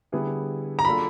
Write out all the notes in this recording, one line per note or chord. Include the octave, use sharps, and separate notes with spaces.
D3 G3 B3 E4 G#4
A#5
F#3 A#3 D4 F4 A4 B5